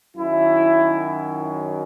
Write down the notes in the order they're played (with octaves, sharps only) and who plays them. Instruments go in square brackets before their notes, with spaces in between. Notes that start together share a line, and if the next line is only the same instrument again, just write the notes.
[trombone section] F#2 D#3 F#3 E4